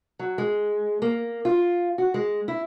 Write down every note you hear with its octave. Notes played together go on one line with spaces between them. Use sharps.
F#3
G#3
A#3
F4
F#4
G#3
E4